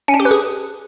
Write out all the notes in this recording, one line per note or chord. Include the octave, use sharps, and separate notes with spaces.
C#4
D4
G4
B4
G#4